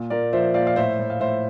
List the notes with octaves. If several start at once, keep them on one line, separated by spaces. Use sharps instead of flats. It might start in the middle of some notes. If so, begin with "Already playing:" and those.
Already playing: A#2
A#2 A#4 D5
F3 C5 E5
A#2 D5 F5
F5
A2 C5 E5
A2
F5
A2 C5 E5